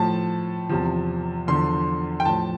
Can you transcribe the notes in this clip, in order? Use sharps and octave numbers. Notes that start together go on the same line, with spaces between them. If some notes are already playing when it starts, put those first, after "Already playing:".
Already playing: A2 F3 A5
E2 C3 F3
E2 D3 F3 C6
G5
A2 F3 A5